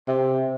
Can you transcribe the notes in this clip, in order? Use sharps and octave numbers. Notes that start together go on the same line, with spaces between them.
C3